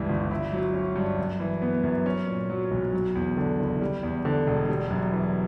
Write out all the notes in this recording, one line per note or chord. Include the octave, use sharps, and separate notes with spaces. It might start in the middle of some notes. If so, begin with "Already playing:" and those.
Already playing: C#2 G2 E3 G3
G1
E4
F#3
C#4
G2
F#2
E3
B3
F#2
C#4
A#2
F#3
B1
F#3
E2
D3
F#1
G3
E2
D3
E1
G3
F#2
E3